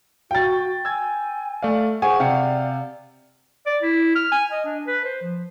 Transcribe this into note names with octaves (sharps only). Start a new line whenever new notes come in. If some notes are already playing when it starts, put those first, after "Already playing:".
F#4 G5 A6
G#5 E6 G#6
A3 D5 F5
G#4 C5 F#5 G#5 C#6
C3 D5 F5 G5 C#7
D5
E4
F6
G#5
D#5
D4
B4
C5
F3